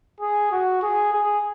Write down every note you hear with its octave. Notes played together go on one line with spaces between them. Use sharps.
G#4
F#4
G#4
G#4